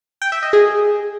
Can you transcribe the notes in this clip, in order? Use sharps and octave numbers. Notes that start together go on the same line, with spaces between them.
G5
E5
D#5
G#4